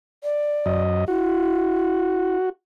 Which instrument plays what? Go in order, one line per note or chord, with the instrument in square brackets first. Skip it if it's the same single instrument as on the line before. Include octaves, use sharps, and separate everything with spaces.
[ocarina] D5
[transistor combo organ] F#2 D#5
[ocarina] E4 [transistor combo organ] F#4